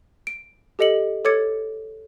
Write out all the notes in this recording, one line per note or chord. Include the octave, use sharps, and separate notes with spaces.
D7
G4 A4 D#5 C#7 F#7
A4 C#5 D6 G#6 A6 C#7